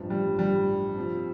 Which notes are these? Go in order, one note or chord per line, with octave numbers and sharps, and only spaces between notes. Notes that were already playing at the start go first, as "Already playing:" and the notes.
Already playing: A1 G2 F3
G3
G3
C3 F3 C4